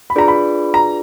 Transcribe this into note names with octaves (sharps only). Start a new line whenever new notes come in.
B5
D4 F4 G#4 B4 D5 A#5
B5
A#5